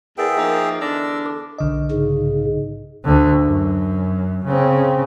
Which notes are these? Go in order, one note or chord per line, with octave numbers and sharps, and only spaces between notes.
E2 G#4 A#4 E5 F#5 G5 A6
F3 A#3 D#4 D#5
E2 D3 D4 D6 E6 F6 A#6
A4 D6
B1 D3 D#5
G#2 C#3
D2 D3
F#2
C#3 C4